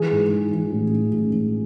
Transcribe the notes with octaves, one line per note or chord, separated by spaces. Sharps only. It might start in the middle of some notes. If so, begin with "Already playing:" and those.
Already playing: E3 G#4
G#2
E3
E3
A1
A1
A1
A1